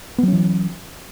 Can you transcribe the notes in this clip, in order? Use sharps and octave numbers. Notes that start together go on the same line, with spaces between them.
E3 F#3 B3 C#4